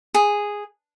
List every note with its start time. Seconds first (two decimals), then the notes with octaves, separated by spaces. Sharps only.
0.14 G#4